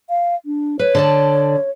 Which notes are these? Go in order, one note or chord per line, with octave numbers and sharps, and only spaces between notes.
F5
D4
B4 C#5
D3 D5 A5